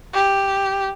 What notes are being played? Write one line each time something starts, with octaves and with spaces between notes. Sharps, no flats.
G4